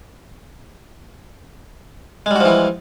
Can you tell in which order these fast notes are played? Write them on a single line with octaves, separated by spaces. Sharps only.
G#3 G3 F#4 F3 E3